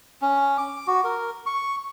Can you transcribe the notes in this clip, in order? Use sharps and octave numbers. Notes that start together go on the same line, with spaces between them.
C#4
D6
F#4
A#4
C#6